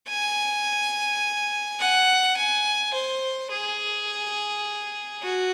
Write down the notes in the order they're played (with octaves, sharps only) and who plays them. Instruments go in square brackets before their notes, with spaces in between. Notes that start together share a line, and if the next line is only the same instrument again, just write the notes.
[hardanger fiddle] G#5
F#5
G#5
C5
G#4
F#4